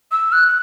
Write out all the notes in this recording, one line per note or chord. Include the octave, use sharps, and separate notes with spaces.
E6
F#6